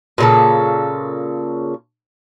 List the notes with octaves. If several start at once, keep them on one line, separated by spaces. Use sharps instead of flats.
A#2 C#3 A4